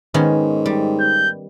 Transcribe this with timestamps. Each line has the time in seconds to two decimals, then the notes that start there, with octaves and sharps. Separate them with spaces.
0.14 G#2 D#3 B3 C#4
0.66 G3
1.00 G6